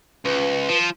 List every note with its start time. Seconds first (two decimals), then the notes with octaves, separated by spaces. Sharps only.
0.25 C#2 B4
0.69 F3